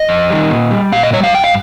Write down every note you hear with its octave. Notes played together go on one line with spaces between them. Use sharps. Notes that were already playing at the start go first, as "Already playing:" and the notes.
Already playing: D#5
F2
D#3 G3
A#2
G3
A#2 F5
D#5
G3 C#5
F5
G2 G5
F5